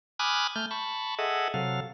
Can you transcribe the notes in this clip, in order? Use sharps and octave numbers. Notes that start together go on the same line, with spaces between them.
G#5 B5 D6 D#6 F6 F#6
A3 F6 G6
A5 B5 C#6
G#4 A4 D#5 E5 F#5
C3 F#3 A4 F5